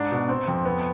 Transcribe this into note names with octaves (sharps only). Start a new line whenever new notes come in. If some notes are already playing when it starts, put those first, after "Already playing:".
Already playing: G#2 D4
B2
C4
F2
B3